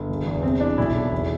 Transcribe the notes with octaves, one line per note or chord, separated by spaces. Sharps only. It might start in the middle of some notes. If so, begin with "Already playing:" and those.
Already playing: G1
E1
E2
C3 C4
E3 D4
B1 E4
B1
E2